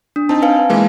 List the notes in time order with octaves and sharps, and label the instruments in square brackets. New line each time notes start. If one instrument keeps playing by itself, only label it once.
[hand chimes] D4
[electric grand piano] C4 D#4 [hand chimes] A5
[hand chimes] B4 F5 G#5
[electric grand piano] E3 G#3 A#3